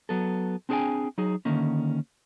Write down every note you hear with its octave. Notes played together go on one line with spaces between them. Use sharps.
F#3 B3 A4
C4 D4 G#4 A#4 G5 G#5
F#3 D#4 G#4
D3 D#3 A#3 C#4